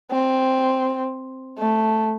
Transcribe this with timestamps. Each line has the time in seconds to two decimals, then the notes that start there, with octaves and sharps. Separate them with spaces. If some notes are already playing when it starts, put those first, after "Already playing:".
0.11 C4
1.58 A3